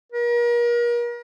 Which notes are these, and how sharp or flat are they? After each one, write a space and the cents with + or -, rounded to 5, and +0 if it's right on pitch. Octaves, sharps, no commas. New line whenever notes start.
A#4 +40